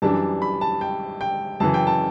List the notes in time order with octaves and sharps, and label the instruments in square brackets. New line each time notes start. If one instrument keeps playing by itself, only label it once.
[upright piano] F#2 E3 G3 D4 A5
B5
A5
G5
G5
F#2 C#3 E3 A5
G5
A5